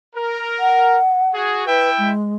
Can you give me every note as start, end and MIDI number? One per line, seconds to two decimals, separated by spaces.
0.16 0.98 70
0.59 1.33 78
1.34 1.62 66
1.34 1.62 68
1.66 2.11 64
1.66 1.90 71
1.66 2.11 76
1.66 2.11 79
1.98 2.36 56